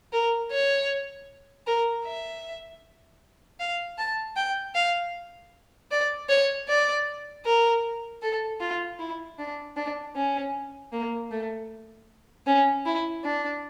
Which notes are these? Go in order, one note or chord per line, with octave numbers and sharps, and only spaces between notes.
A#4
C#5
A#4
E5
F5
A5
G5
F5
D5
C#5
D5
A#4
A4
F4
E4
D4
D4
C#4
A#3
A3
C#4
E4
D4